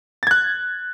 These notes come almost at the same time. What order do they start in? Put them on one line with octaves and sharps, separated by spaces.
A6 G#6 F#6